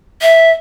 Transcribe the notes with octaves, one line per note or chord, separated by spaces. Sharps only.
E5